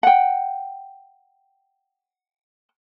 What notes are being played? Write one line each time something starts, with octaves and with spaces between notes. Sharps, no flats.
F#5 G5